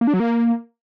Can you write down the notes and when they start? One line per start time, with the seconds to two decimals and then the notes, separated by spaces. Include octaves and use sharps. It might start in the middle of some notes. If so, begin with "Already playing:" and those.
0.01 A#3
0.07 D4
0.14 F#3
0.20 A#3